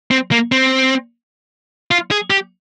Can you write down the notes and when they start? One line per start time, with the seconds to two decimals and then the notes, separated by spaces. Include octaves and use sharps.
0.11 C4
0.31 A#3
0.52 C4
1.91 F4
2.11 G#4
2.30 G4